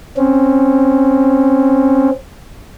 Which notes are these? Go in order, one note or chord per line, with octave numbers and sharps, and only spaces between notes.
C4 C#4